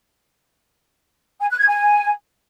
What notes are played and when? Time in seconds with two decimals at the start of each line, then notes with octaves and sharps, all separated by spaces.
1.39 G#5
1.49 F#6
1.58 G#6
1.67 G#5